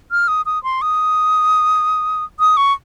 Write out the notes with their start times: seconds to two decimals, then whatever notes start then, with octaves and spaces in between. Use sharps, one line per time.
0.11 F6
0.28 D#6
0.46 D#6
0.63 C6
0.82 D#6
2.40 D#6
2.57 C#6